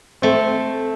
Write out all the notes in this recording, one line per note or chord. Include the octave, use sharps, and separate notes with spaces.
A3 C4